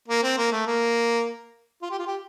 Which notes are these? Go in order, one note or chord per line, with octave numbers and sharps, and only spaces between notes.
A#3
C4
A#3
A3
A#3
F4
G4
F4
G4